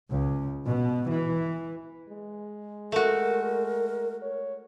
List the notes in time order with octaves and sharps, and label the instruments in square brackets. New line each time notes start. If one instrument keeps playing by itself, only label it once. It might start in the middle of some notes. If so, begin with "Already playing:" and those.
[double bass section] C#2
B2
E3
[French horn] G#3
[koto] A3 F#4 [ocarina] A#4
[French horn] C#5